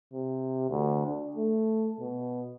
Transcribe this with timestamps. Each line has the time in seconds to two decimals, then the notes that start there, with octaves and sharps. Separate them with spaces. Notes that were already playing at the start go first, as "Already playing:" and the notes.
0.13 C3
0.70 D2
1.06 D4
1.37 A3
2.01 B2